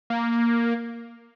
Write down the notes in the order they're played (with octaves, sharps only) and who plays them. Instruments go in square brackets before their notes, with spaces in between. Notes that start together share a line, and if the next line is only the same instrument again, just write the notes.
[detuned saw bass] A#3